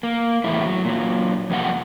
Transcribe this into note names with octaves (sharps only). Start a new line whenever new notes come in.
A#3
E2 A2 G#3 A3 E4
F#3
A#2 F#3
F2 C3 G3 A#3 G4 F#5